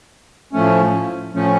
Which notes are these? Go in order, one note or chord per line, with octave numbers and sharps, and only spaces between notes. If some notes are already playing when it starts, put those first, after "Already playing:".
A2 F3 A3 C#4
A2 F3 A3 C#4